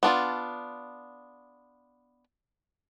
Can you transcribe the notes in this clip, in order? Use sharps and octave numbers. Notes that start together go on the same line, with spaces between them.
B3 D4 F4